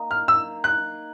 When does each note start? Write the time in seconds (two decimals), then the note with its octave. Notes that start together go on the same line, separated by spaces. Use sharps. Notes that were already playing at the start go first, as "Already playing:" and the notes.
Already playing: A#3 D#4
0.11 F6
0.28 E6
0.64 F#6